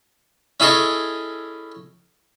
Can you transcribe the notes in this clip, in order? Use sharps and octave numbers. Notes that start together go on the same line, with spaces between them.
C#4 E4 G#4 A4 C#5 D#5